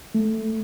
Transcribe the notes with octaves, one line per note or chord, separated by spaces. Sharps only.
A3